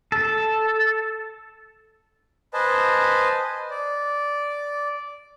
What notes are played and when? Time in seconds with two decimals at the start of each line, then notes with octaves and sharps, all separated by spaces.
0.12 A4
2.54 B4 C5 D#5 G#5 A5
3.71 D5